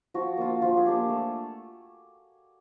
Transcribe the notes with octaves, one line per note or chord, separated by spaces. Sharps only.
F3 F#4
A#3 D4 F4
F3 F4
G#4
A#3 D4 F4 G4
G#4
A3